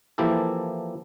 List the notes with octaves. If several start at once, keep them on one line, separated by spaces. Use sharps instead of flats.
E3 F3 A#3 E4 G4 A4